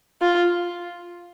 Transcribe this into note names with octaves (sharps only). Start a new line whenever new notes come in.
F4